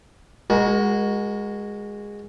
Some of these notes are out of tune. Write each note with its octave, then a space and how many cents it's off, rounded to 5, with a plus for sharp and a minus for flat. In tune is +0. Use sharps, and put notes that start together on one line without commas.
G#3 -15 F#4 +0 A#4 +30